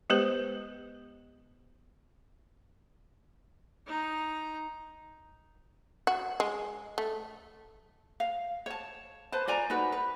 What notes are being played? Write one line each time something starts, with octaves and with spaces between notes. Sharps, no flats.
G#3 B3 G4 B4 C5
D#4 A#5
F#4
G#3
A3
F5
C#5 A5
B4 C5 A5
F4 D5 G#5 A#5
D#4 F#4 B4
B4